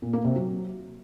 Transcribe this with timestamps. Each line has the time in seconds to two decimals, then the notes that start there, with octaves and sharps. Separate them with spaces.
0.02 A#2
0.13 A#3
0.24 C3
0.36 F#3